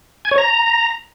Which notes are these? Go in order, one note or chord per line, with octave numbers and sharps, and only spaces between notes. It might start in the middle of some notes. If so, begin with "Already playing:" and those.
G#5
C#5
A#5